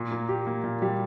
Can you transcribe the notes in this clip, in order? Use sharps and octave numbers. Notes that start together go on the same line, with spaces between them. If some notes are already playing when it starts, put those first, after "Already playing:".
Already playing: A#2
A#3
G4
A#3
A#2
G3